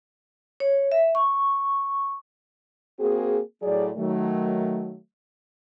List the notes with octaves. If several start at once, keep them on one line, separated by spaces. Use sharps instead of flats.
C#5
E5
C#6
A#3 C4 F#4 G#4
A2 F#3 G#4 D5
D#3 F#3 A3